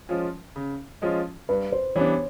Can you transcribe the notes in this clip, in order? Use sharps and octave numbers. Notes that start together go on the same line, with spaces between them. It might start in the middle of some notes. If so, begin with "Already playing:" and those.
F3 G#3 C#4 F4
C#3
F3 G#3 C#4 F4
G2 B4
C5
E3 G3 B3 D4 C#5